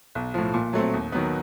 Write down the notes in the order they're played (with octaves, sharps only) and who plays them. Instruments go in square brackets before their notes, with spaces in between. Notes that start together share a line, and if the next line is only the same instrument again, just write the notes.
[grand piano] B1
A2 F3
A#2
F#3 A3 C4
D#2
D#3 F#3 B3